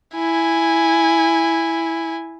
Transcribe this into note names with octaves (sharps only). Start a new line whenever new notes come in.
E4 G#5